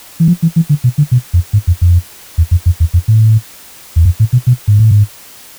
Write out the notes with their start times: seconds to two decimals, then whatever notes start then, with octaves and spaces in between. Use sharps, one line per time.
0.20 E3
0.28 F3
0.42 E3
0.56 E3
0.69 D3
0.84 B2
0.98 D3
1.11 B2
1.33 F2
1.53 G#2
1.67 F2
1.81 F2
2.38 E2
2.51 F2
2.66 F2
2.80 E2
2.94 F2
3.08 A2
3.96 E2
4.05 F2
4.20 A2
4.33 B2
4.47 B2
4.68 G#2
4.79 A2
4.91 G#2